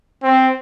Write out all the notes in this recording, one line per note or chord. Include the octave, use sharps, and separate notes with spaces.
C4